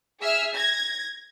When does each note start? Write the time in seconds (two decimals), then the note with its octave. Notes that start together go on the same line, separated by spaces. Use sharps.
0.20 G#4 E5 E6 F6
0.53 G#6 A#6